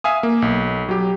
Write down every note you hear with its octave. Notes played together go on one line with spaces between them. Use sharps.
E5 F5 G#5 D#6
A#3
B1
F#3 G4